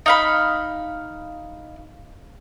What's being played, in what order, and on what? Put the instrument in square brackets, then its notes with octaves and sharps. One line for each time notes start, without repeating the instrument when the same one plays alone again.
[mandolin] D#4 F5 B5